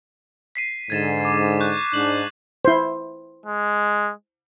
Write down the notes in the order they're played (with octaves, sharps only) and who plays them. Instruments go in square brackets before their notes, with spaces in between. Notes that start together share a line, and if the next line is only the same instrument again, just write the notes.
[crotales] B6 C7 D#7
[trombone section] G#2 D3 [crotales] G#6 A6 E7
[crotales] D6
C#6 F#6 G6
[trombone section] G#2 D4 [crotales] F#7
[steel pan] E4 C5
[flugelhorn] G#3